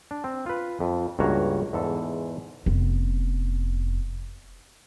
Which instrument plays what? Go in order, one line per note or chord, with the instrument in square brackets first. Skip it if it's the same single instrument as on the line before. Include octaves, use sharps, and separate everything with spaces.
[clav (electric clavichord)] D4
C4
F4 B4
F2
C#2 G2 A#3 F#4 C#5 A#5
E2 G#2 A4
[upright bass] F1 B3